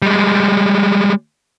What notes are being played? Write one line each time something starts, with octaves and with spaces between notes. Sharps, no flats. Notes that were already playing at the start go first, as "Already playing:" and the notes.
G3 G#3